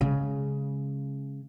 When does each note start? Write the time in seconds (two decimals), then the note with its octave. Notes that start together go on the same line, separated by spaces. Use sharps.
0.01 C#3 G#3